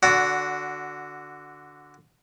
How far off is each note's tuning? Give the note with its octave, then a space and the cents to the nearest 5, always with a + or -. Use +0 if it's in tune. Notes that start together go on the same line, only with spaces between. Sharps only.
D3 +0 F#4 +0 D5 -30